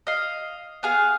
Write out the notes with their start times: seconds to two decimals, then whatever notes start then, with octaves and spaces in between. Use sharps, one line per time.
0.07 D#5 F5
0.83 B3 G#4 F5